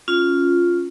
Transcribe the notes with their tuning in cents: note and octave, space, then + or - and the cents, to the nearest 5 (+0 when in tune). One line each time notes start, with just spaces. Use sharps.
C#4 +0 F4 +0